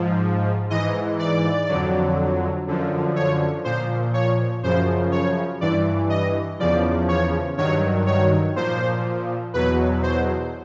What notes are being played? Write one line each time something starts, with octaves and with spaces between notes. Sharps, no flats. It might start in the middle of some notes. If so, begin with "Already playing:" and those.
Already playing: G#2 F3
G#2 E3 D#5
D5
F2 D3 F#3
F#2 D3 F3
C#5
A#2 F3 C5
C#5
F#2 C#3 F3 C5
C#5
G2 E3 D5
D#5
E2 C#3 F3 D5
C#5
G2 D#3 F#3 C#5
C#5
A#2 F3 C5
E2 B2 F#3 B4
C5